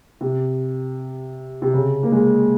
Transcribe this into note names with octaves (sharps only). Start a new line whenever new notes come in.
C3
C3
C#3
A#3
G#3